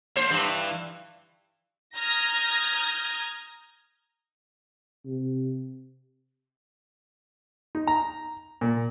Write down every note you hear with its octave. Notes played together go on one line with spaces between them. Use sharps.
A#3 D4 C5
G2 E3
A#5 D#6 F6 G6 G#6 A#6
C3
D#4
A#5
A#2